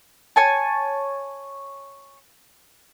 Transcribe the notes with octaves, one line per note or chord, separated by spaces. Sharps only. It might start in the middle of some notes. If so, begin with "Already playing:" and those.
C#5 G#5 A5